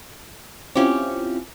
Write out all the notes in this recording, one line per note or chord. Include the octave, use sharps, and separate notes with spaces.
C4 C#4 E4 F4 G4